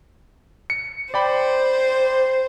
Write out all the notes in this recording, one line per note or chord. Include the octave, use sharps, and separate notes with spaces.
C#7
C5 D5 G5 B5